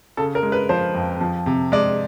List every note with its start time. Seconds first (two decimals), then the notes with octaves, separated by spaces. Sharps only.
0.17 C#3 A4
0.35 A#4
0.43 G#3
0.52 B4
0.69 F3 C5
0.95 F2
1.21 F3
1.46 C3
1.72 G#3 D5